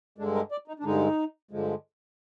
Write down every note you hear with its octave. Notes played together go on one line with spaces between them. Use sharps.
G2 D3 G#3 D4
A#4
D5
D#4
D4
G2 D3 G#3 D#4
G2 D3 F3 G#3